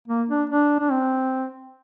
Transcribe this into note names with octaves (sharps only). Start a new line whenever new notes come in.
A#3
D4
D4
D4
C4